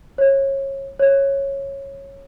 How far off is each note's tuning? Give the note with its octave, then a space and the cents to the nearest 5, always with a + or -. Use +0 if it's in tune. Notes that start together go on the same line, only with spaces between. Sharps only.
C#5 -25
C#5 -10